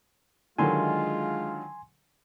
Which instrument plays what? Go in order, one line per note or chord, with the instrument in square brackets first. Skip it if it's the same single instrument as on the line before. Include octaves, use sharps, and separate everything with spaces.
[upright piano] D3 D#3 F#3 [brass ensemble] G#3 F4 [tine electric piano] G#5 C6